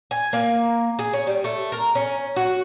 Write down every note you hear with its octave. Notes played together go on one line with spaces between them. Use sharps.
G#5
A#3
G#4
C#4
G3
A3
A#4
C#4
F#4